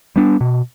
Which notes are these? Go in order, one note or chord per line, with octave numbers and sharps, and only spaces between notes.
G3 B3 D4
B2